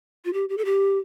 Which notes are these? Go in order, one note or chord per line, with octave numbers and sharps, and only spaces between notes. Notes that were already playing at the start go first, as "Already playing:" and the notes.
F4
G4
G4
A4
G4